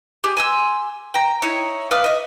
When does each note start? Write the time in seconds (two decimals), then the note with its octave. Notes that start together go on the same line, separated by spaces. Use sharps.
0.24 G4 G#4
0.37 G#5 C6 E6
1.14 G5 A#5
1.42 D#4 E4 C#5
1.91 B4 D5 F5 D#6
2.04 D#5 E5